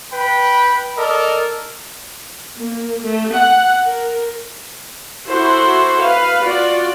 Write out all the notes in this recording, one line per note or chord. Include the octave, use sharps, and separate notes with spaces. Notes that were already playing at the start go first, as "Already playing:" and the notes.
B4 G5 B5
A4 A#4 D5 D#5
A#3
A3
F#5
A#4
E4 F#4 A4 C5
B4 F5
F4 F#4 D5